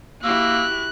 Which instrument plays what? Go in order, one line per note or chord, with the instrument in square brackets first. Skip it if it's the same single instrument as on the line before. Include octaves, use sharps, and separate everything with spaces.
[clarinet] A#3 [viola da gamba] E4 F#4 G4 [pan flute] E6 [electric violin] F#6